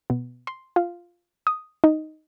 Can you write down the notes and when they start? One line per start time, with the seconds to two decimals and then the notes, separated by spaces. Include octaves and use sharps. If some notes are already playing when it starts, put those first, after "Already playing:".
0.10 B2
0.47 C6
0.76 F4
1.47 D#6
1.84 D#4